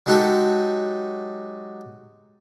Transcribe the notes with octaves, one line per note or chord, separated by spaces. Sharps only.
F#3 G#3 D#4 F#4 G4 A4